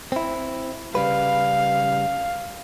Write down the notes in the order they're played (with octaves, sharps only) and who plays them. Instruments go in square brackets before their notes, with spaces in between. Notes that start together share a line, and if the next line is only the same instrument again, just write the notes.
[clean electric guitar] C4 E4
[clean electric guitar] C#3 G3 B4 [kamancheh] F5